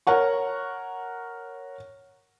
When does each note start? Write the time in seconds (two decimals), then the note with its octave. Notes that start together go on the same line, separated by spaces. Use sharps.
0.07 A#4 C#5 F#5 C#6